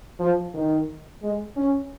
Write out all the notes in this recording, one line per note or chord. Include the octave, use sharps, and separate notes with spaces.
F3
D#3
G#3
C#4